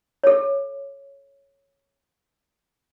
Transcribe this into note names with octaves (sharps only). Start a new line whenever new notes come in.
A4 C#5